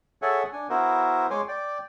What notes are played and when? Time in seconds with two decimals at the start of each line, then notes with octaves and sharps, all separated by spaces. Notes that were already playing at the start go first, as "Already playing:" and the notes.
0.22 G#4 A4 C#5 E5 F#5 G#5
0.53 D4 G#5
0.70 B3 E4 F#4 A#4 C5
1.30 G#3 C#5 G#5 C6 D6
1.48 D5 G5